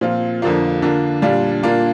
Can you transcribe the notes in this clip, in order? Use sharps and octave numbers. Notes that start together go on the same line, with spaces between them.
A#2 F3 C4 F4
F2 D3 F3 A#3
D3 A#3 D4 F4
A#2 G3 D4 F4
A#2 A#3 D4 F4